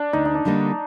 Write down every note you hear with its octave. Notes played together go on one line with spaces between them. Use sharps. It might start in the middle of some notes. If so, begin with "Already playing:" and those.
Already playing: D4
D2 D#4
D#4
D4
D3 G3 A#3 D#4